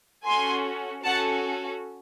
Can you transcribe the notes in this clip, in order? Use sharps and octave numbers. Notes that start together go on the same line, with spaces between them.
C#4 F#4 A4 G#5 C6
C#4 F#4 A4 F#5 A5